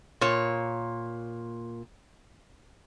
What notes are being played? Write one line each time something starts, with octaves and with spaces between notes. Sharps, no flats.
A#2 A#3 C#5